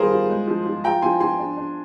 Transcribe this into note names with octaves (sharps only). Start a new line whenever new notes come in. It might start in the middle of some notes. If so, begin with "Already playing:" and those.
Already playing: D#3 G3 F4 G#4 A#4 C5
F4
G#3
F3
F3
F4 G5 A#5
F3 G#5 C6
F3 G#5 C6
D4
D4